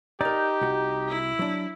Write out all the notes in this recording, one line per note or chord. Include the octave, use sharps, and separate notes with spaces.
D#4 G4 A#4 D5
C2 F#4
E4
F#3 D4